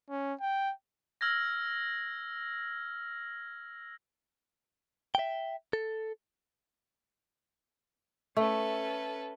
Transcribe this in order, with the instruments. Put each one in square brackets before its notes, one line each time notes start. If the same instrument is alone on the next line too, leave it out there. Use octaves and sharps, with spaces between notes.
[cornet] C#4
G5
[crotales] E6 F6 G#6 A#6
[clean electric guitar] E5 G5
A4
[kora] A3 [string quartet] C#4 A4 B4